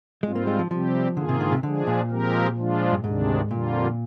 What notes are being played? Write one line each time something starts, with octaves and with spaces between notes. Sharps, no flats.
G#2 G3 G#3 C4 F4
A#3
G#3
F3
C3 F3 G3 C4 G4
G#2 D3 D#3 A#3 F4 G#4
C3
D3
C3
D3 F3 G#3 D4 G#4
A#2
F3 G#3 C4 G4 A#4
F3 G#3 D4 F4
G2
D2 G#2 C3 D#3 G#3 D4
F2 A#2 D3 G3 A#3 F4